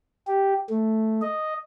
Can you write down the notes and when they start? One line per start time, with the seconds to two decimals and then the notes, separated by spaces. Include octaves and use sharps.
0.27 G4
0.70 A3
1.22 D#5